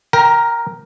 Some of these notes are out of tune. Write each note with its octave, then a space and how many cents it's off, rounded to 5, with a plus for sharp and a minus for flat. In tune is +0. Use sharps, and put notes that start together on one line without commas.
A#4 +0 G5 +0 A#5 +30